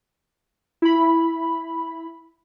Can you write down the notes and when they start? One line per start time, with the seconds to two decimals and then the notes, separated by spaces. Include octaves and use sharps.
0.82 E4 B5